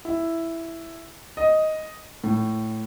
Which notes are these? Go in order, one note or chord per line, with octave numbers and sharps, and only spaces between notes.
E4
D#5
A2